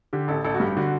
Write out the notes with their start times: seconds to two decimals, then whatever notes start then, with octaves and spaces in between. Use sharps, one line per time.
0.13 D3 G4
0.28 A1 A4
0.44 A1 A4
0.54 F#4
0.60 G2 G4
0.77 D3 F#4